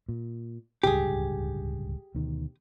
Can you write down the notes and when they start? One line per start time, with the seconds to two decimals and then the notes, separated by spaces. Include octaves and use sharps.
0.09 A#2
0.83 D1 C#2 G2 G4 G#4
2.15 D2 B2 D#3